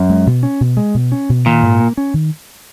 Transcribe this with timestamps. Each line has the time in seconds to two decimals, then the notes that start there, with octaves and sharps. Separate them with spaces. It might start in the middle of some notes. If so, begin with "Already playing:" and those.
Already playing: F#2
0.10 G#3
0.27 B2
0.43 C#4
0.61 B2
0.77 G#3
0.94 B2
1.12 C#4
1.29 B2
1.46 A#2 D#3
1.63 G#2
1.80 A#3
1.97 C#4
2.14 D#3